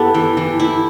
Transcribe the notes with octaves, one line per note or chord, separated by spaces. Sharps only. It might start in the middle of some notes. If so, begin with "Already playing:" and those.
Already playing: B3 E4 G4 A4
E3
E3
E4